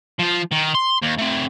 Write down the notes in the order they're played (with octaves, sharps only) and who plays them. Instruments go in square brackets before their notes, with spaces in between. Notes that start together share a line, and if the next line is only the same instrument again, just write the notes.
[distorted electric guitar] F3 F4
D#3
C6
D#2
A3 C4